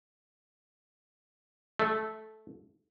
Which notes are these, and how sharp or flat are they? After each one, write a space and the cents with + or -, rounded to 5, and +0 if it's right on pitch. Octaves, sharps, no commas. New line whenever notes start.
A3 -15